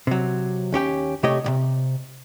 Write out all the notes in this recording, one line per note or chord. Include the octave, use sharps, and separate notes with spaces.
C3 F#3
D#2 C#4 G4 G5
C3 A3 G4 C#5 D#5
B1 C3